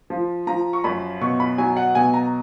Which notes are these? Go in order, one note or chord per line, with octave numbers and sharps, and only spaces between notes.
F3
F3 A#5
C#6
F#2 B5
B2 C#6
B5
F#3 G#5
F#5
B2 G#5
A#5